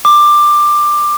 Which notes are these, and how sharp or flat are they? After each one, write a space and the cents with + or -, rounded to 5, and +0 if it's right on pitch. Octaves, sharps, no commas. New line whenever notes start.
D6 +15